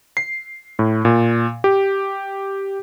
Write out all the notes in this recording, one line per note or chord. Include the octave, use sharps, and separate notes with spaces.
C7
A2
A#2
G4